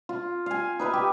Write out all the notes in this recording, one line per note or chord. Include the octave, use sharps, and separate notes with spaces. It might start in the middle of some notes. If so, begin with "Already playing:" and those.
F4
F5 G#5
D#4 B4 E5
G4